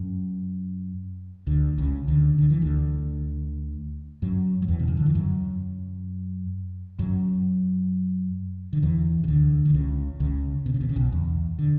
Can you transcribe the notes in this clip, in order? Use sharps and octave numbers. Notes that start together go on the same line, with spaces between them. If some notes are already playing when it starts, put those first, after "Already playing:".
Already playing: F#2
D2 D3
C#2 C#3
D2 D3
D3
E3
D2 D3
F#2 F#3
F#3
E2 E3
B2
C#3
D3
E3
F#2 F#3
F#2 F#3
D3
E2 E3
C#3
D2 D3
D3
C#2 C#3
C#2 C#3
B2
C#3
B2
C#3
B1 B2
E2
D3